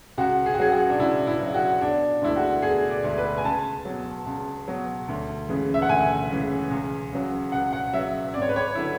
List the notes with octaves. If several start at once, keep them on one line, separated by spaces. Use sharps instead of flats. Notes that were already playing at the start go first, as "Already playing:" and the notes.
C#2 F#4
G#4
F#4
C#3 F#3 G#4
F#4
D4
C#2 E4
E4
C#3 F#3
F#4
E1 D4
D2 D3 G#3 E4
F#4
E1 G#4
D5
D2 D3 G#3
B4
G#5
C#2 A5
B2 F#3
C#2
B2 F#3
D2
C#3 E3 G#3
E5
F#5
D2 G#5
C#3 E3 G#3
C#2
C#3 F#3
C#2 F#5
F#5
C#3 F#3 E5
G#1 D5
C#5
B4
C#5
D3 F#3 E4